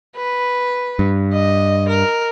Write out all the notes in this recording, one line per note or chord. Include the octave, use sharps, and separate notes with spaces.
B4
G2
D#5
A#4